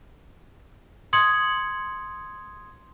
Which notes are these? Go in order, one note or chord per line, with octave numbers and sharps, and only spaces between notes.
C6 D#6 G#6 C#7 F#7